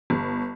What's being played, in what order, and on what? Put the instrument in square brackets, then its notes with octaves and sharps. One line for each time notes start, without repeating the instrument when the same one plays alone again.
[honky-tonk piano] G1